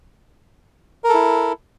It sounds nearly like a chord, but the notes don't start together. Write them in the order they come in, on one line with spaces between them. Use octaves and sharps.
A#4 A4 E4